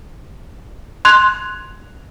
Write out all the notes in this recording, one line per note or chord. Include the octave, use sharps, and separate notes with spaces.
C6 F#6 G#6 F7